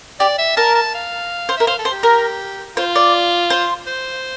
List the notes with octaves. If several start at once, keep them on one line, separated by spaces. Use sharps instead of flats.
G4 D5
E5
A#4 A5
A5
F5
C5
A#4 E5
C5 F5
A4
C5
G4
A#4
F4 C5
D5
C5
C5